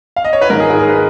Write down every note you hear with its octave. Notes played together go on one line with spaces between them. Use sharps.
F5
D#5
C#5
B4
G#2 D#3 A#4
G#4
G#4
A#4
D#3 B4